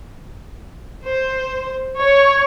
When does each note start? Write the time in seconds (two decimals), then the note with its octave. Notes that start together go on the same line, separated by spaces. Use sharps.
1.05 C5
2.00 C#5